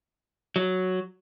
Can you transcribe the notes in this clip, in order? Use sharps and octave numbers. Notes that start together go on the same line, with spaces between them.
F#3